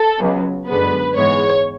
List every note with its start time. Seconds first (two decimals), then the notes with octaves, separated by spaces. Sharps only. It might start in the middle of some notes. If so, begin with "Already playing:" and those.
Already playing: A4
0.20 C#2 C#3 F#3 B3
0.68 F#2 D3 G#3 B3 B4
1.16 G#2 E3 G#3 B3 C#5